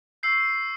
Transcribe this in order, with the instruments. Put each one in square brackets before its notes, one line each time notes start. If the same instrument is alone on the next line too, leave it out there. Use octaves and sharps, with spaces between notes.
[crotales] C#6 E6 G6 C7